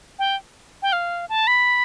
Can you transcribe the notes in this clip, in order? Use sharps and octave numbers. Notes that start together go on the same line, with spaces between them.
G5
G5
F5
A5
B5